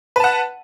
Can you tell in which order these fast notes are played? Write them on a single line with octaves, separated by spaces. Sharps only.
B4 A5 F#5